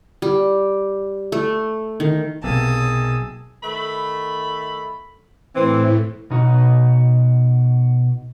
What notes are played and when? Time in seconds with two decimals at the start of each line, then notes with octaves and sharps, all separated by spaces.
0.22 G3
1.32 A3
2.00 D#3
2.44 B1 C3 A#3 G#4 A5 D#6 E6
3.63 D#3 A3 B5
5.56 A2 E3 C4
6.30 B2 D#4 F#4